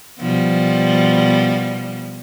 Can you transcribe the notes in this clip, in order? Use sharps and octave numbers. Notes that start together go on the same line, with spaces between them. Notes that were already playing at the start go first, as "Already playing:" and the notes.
B2 F3 G3